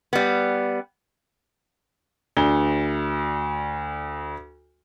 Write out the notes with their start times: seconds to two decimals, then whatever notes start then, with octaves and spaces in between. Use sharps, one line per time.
0.13 G3 B3
2.37 D2 G7